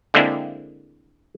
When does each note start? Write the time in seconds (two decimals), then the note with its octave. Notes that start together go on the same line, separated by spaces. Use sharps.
0.14 D3 G#3 A#3 C4 D4 E4